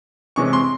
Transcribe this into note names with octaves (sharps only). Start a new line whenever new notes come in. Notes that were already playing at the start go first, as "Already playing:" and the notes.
C3 E3 G#3 C#4 C#6
C6